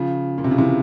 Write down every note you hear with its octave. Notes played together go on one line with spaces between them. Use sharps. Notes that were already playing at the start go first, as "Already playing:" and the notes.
Already playing: C#3 F3
A#2
C3
C#3
C3 E3